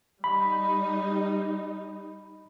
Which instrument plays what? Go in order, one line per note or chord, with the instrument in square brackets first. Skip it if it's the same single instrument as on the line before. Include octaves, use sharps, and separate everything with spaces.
[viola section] G3 D#4 [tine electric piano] B5